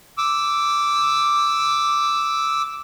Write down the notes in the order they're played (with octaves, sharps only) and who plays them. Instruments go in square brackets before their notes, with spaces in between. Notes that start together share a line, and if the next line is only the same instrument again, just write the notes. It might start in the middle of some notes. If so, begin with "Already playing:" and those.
[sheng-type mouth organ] D6 E6